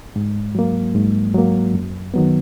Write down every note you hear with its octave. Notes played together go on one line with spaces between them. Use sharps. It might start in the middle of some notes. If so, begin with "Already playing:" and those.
G#2
F#3 A#3
G#2
F#3 A#3
F#2
D#3 F#3 B3